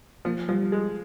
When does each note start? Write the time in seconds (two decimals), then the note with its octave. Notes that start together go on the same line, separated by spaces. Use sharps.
0.25 F3 A#3
0.48 F3 G3
0.72 G#3